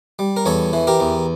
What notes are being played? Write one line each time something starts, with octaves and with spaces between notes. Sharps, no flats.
G3
A#4
E2 A4 C#5
E3
G4 A#4
E2